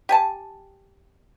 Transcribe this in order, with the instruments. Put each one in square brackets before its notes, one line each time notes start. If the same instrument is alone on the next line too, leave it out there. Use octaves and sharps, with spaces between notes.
[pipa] G4 G#5 A5